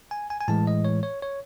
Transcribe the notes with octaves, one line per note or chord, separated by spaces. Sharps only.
G#5
G#5
G#5
A2 E3 G#3 A5
D#5
C#5
C#5
C#5